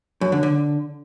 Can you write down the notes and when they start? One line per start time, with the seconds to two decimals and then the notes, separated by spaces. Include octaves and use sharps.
0.21 F#2
0.32 D3
0.43 D3